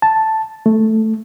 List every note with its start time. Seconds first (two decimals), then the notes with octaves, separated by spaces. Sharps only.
0.02 A5
0.66 A3